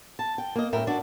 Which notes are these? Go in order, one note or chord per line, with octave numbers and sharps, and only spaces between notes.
A5
G5
A#3 D#5
F#2 A2 A#4 E5 G5
D4 F#4 D5